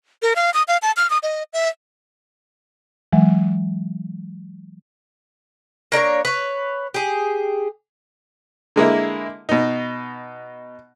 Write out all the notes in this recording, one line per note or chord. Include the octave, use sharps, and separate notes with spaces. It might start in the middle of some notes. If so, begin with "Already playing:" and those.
A#4
F5
D#6
F5
A5
F6
D#6
D#5
E5
E3 F#3 G#3
A#3 D4 A#4 C#5
B4 C#5
G4 G#4
D3 G#3 A#3 E4
B2 D#4